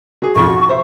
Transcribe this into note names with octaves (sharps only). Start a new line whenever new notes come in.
F#3 G#4
B1 F2 F3 C#6
F#4
C5 E5